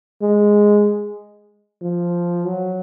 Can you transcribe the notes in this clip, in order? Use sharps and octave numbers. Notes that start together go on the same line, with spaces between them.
G#3
F3
F#3